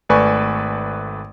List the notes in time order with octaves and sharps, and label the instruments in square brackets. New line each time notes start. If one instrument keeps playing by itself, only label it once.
[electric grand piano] G#1 A3 B4 D5 G#5 C#6